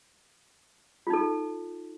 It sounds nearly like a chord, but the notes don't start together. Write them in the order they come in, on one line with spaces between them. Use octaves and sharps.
F4 D#4 A4